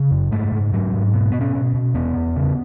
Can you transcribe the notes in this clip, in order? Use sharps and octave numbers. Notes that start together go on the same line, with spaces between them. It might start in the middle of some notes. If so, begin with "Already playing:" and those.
Already playing: C#3
F#2
G#2 A3
G#2
G#2 F#3
G#2
B2
B2 B3
C#4
B2
B2
E2 B3
E2
C#3